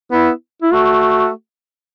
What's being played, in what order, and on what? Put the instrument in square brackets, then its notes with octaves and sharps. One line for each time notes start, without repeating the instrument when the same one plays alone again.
[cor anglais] B3 [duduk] E4
[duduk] E4
[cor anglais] A3 [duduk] F#4